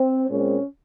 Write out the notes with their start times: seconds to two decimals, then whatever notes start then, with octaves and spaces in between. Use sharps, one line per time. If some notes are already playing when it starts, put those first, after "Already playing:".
Already playing: C4
0.30 A#2 G#3 C4 C#4